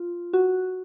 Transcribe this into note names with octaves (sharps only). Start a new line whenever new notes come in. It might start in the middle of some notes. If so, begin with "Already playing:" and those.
Already playing: F4
F#4